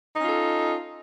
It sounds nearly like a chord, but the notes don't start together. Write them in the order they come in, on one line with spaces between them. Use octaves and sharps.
D#4 C#4 F4 A4